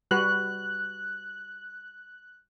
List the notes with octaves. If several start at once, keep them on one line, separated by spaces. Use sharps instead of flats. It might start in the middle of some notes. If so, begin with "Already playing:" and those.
G3 F#4 B4 F#6